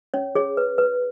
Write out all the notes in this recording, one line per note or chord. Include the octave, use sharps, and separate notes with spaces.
C#4 C#5
G#4 C#5
B4
B4